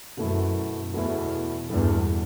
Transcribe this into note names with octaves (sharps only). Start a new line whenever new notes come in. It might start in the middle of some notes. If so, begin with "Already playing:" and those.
F#2 B2 A3 E4
E2 B2 A3 E4
E2 G2 B2 A3 E4